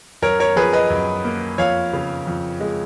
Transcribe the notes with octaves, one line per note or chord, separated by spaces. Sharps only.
F#2 A#4 C#5
A#4 C#5
F3 G#4 B4
B4 D#5
F#2
A#3
F2 C#5 F5
C#3
F2
G#3